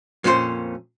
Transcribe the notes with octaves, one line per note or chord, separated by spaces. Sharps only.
F2 A#2 C#4 F4 C5